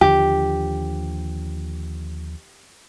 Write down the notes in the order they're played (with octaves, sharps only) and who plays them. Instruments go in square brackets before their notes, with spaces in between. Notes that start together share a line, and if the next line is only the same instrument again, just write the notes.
[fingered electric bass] D#2 D3 F3 [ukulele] G4